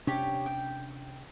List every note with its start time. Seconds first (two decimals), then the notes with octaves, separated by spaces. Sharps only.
0.07 C3 C#4 D4 G4 C#5
0.46 G5